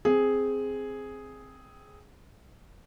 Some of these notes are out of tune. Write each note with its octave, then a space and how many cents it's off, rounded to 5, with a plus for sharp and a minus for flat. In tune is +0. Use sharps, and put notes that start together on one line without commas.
C4 +0 G#4 +0